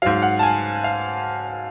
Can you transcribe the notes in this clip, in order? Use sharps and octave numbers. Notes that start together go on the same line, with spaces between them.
G#2 F#3 F5
F#5
A5
G#5
F5